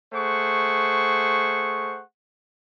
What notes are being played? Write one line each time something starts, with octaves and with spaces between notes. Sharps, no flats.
A3 G#4 C5 F#5 C#6